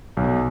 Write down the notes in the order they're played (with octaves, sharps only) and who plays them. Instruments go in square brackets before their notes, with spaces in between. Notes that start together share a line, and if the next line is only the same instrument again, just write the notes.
[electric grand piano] B1